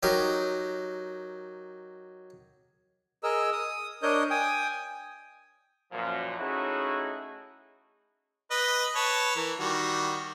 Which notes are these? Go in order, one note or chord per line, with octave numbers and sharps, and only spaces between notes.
F#3 D#4 G4 A#4
G#4 A#4 D#5 A#5 E6
D#6
D4 A#4 C#5 D#5 D#6 G6
G5 G#5 D#6
F#2 A#2 F3
A3 C#4 D#4 E4 F#4 G#4
B4 D#5
B4 C#5 A5
E3 A#4
D#3 G3 F#4